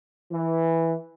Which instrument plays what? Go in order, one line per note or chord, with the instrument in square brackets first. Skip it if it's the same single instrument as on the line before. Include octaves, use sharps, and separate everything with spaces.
[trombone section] E3